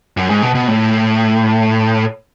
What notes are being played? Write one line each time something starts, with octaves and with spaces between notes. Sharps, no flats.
F#2
G#2
B2
B2
A2